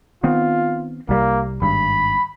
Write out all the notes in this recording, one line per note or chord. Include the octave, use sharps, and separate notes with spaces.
D#3 B3 C4 F4
C2 G3 A#3
G#1 G2 B5